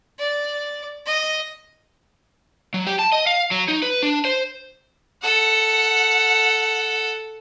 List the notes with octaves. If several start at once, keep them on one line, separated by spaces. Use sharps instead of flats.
D5
D#5
F#3
G4
A5
D#5
F5
F#3
D#4
B4
D4
C5
A4 F#5